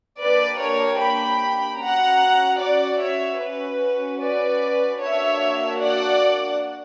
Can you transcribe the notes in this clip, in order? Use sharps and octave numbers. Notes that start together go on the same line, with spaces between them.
A#3 D4 G4 B4 D5
A#4 C#5
G5 B5
C#4 F#4 F#5 A#5
D5 F#5
C#5 E5
C#4 F#4 B4
B4 D5
A#3 D4 F#4 C#5 E5
D5 F#5